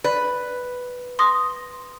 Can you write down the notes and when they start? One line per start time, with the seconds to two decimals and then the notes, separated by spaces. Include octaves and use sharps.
0.04 B4 D5
1.19 C6 D#6 A#6